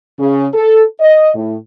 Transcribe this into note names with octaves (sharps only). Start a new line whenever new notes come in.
C#3
A4
D#5
A2